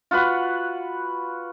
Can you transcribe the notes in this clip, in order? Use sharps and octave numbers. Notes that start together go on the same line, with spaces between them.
F4 F#4 B4 F#5